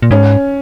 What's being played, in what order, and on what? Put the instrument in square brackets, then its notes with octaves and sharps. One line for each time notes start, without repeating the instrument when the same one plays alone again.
[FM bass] A#2
[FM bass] G#2 [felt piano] C#4